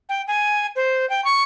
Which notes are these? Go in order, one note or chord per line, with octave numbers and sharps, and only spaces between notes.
G5
G#5
C5
G5
C#6